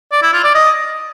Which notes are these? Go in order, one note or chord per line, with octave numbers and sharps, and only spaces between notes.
D5
E4
F4
D5
D#5